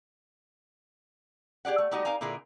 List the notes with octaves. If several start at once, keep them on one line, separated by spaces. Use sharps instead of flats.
G4 G#4 D5 F#5
A3
G3 A3 D#4 F#4 G4 D#5
D#4 A#4 F5 G#5 A#5
A#2 D3 E4 G#4 A#4